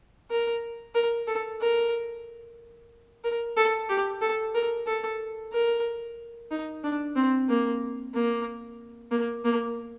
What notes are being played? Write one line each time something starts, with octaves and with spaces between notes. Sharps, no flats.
A#4
A#4
A4
A#4
A#4
A4
G4
A4
A#4
A4
A#4
D#4
D4
C4
A#3
A#3
A#3
A#3